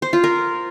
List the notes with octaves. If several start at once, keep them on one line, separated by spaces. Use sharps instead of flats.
C5
F4
A#4